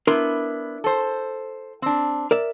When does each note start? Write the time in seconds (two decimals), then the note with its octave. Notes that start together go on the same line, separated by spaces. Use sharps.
0.07 B3 D4 E4 A#4 C6
0.84 A4 C5
1.82 C4 D4
2.31 A#4 D5 E5